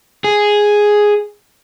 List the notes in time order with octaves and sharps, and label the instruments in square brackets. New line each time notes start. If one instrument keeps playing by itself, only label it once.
[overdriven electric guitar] G#4